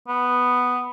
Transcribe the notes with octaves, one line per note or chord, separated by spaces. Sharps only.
B3